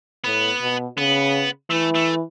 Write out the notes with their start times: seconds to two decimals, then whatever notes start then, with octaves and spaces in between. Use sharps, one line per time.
0.24 A2 B3
0.61 B2
0.97 C#3 B3
1.70 E3 A3
1.95 A3